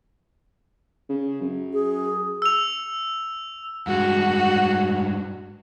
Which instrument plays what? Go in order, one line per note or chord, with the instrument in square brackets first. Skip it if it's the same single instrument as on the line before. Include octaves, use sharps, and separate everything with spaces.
[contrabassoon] C#3
F#2
[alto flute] G#4
[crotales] E6 F7
[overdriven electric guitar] G2 G#3 [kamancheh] F#4